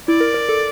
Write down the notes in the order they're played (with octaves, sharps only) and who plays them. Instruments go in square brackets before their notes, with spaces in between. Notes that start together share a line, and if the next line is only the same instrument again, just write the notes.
[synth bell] E4 [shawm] D5
[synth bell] A#4
A#4
A4